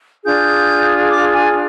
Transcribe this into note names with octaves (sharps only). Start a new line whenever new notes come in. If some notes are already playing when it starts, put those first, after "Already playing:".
D4 F4 G#4 G6
D6
G#5